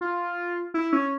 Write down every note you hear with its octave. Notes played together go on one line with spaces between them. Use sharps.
F4
E4
C#4